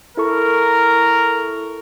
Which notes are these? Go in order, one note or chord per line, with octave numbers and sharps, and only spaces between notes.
E4 A4 A#4 C#6